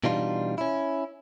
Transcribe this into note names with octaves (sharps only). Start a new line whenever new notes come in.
B2 E3 G3 D4 D#4 F4
C#4 E4